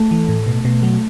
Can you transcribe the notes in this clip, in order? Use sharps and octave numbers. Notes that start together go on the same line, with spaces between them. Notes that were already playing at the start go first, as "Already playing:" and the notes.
Already playing: A3
E3
A2
B2
B2
F#3